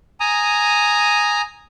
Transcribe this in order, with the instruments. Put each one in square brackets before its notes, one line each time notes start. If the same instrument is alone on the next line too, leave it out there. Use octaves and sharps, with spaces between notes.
[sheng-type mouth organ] G#5 A#5 D#6